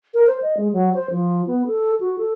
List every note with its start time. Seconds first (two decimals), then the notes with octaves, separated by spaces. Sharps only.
0.14 A#4
0.27 C5
0.42 D#5
0.57 G#3
0.73 F#3
0.95 C5
1.11 F3
1.47 B3
1.67 A4
2.00 F#4
2.18 A4